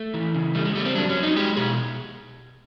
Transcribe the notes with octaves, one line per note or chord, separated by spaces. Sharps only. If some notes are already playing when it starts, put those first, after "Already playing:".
Already playing: A3
E3
C#3
G3 A3
G#3
G3 A3
C4
F#3 D4
C#4
F#3
D#4
G#3 G4
B2 G#4